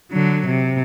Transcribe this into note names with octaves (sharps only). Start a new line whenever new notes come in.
D3 F#3
C3